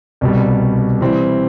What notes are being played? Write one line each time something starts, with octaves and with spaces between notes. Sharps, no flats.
C2 B2 G3
E3 G3 C4